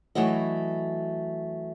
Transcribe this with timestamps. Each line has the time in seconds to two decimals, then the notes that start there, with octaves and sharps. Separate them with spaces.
0.15 E3 F#3 A3 F#4 D#5